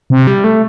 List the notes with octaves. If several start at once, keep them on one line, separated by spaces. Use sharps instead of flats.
C3
G3
A3